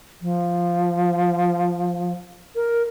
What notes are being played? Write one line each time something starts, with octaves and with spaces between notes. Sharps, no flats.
F3
A#4